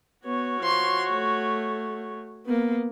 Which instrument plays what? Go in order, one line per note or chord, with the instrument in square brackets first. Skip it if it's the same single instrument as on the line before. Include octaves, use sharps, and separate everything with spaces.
[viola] B3 [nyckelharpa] F#4 C#5
[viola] F3 C6
A3
A#3 B3